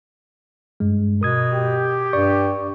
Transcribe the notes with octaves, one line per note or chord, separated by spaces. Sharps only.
G2 G#3
B2 A#4 D#6 G#6
G4
G2 D5 C#6